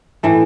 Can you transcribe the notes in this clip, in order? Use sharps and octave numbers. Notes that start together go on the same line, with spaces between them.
A2 E3 A3